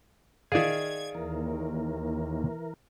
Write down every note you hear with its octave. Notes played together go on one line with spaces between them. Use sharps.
D#3 G#4 D5 E5 F5 G#6
D#2 E3 A#4